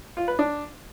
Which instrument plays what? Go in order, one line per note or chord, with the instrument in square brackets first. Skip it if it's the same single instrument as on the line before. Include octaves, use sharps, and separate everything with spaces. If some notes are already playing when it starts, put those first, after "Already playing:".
[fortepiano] F4
B4
D4